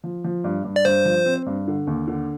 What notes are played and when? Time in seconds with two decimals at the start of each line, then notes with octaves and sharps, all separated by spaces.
0.04 F3
0.24 F3
0.44 G2
0.64 G2
0.76 D5
0.85 G2 C5
1.05 F3
1.26 C4
1.46 G2
1.68 D3
1.87 D#2
2.08 D3